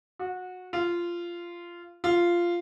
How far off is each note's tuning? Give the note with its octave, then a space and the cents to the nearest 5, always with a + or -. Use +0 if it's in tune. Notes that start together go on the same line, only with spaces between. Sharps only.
F#4 -20
F4 -15
F4 -10